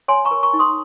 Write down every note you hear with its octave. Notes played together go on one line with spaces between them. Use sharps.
C#5 G#5 C6
A#5 C#6
A#4
A#5 C#6
D#4
C6 D#6